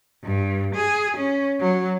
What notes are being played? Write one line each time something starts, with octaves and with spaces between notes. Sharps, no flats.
G2
G#4
C#4
F#3